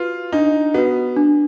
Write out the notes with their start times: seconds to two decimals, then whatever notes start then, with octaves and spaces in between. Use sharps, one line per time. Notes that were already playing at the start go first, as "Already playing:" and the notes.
Already playing: F4 F#4 B4
0.32 D4 D#4
0.74 B3 F#4 B4
1.17 D4